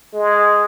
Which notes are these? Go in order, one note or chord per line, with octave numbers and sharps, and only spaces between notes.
G#3